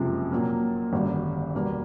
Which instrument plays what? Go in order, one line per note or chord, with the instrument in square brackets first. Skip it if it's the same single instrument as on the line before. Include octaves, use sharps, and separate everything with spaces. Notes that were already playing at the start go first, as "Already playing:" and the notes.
Already playing: [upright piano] F#1 F2 C3 F3 G#3
A#2 F#3 A#3
G#1 F#2 D3 G3
E2 B2 G3 A#3